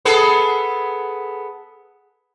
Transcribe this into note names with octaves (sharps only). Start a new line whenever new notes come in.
B3 G#4 A4